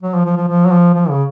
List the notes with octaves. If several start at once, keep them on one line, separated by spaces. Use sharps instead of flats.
F#3
F3
F3
F3
F3
F#3
F3
F3
C#3